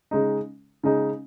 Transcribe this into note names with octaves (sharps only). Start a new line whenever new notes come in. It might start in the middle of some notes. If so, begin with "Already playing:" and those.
C#3 G#3 D#4
C#3 G#3 D#4